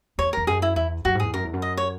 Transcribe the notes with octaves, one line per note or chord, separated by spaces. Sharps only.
E2 C#5
E2 A#4
F#2 G#4
E4
E2 E4
F#2 F#4
G#2
E2 G#4
F#2 A#4
E2
F#2
D#5
C#5